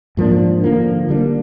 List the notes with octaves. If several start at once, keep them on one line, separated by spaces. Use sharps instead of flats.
G#2 F3 A#3 D4
D3 F3 A#3
D3 G3 A#3 D4